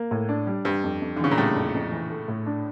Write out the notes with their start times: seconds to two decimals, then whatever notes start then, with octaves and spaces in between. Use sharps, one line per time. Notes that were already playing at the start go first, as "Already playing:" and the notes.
Already playing: A#3
0.11 A2
0.29 D4
0.47 G3
0.65 G2 G3
0.84 F2
1.02 F2
1.16 D3
1.20 C#3 E3
1.31 A#2
1.37 A2 G3
1.56 F2
1.75 F2
1.92 E3
2.10 A3
2.28 A2
2.46 D4